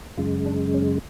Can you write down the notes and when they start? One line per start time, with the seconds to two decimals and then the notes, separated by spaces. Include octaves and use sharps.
0.18 F#2 C#3 G#3 F4
0.46 D4
0.74 C#4